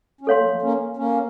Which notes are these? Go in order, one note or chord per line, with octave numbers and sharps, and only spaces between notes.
C#4
A3 C4 A4 C#5 F5 C6
F#3 A#3
F3 A3
A#3 C#4
A#3 C#4